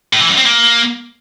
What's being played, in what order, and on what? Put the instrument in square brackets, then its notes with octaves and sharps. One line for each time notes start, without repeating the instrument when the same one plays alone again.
[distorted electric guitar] A2
E3
F#2
C4
A#3